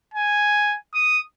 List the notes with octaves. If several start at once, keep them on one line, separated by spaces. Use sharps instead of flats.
G#5
D#6